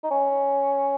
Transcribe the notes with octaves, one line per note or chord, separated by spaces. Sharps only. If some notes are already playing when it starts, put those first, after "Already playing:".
D#4
C#4